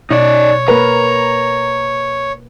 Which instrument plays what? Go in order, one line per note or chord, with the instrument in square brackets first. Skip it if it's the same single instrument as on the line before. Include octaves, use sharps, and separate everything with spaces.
[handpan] B2 [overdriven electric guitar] D#4 D5 [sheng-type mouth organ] C#5
[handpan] A#3 A#4 B4 [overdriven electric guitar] A#5